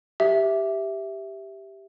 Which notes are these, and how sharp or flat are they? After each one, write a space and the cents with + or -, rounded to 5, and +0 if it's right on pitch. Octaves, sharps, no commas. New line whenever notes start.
G4 +0 E5 +0